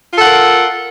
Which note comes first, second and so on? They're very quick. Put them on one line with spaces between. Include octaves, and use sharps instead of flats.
F4 A4 F#5 A#4